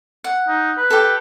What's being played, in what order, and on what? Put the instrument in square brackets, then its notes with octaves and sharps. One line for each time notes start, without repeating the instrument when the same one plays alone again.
[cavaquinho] F#5
[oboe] D#4
B4
[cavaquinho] G4 A4